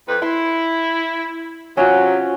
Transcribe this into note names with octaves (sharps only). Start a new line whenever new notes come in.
F2 B4
E4 C6
C3 F#3 C#4 F4 F#4